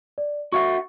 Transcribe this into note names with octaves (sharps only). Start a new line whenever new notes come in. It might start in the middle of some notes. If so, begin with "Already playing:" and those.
D5
F#4 E5 F#5 C#6